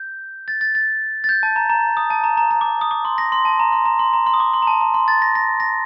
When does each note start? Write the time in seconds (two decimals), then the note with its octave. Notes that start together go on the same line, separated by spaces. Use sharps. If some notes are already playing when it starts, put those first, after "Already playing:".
Already playing: G6
0.48 A6
0.61 A6
0.75 A6
1.24 A6
1.29 G6
1.43 A5
1.56 A#5
1.70 A#5
1.97 D#6
2.10 A5
2.24 A#5
2.37 A#5
2.51 A#5
2.61 D6
2.81 D#6
2.91 D6
3.05 C6
3.18 A#6
3.32 C6
3.45 A5
3.60 A#5
3.72 C6
3.85 A#5
3.99 C6
4.13 A#5
4.26 C6
4.34 D#6
4.40 D6
4.54 C6
4.62 A#5
4.67 A5
4.81 A#5
4.94 C6
5.08 A6
5.22 A#6
5.35 A#6
5.60 A#6